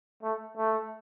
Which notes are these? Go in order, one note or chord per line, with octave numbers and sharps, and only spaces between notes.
A3
A3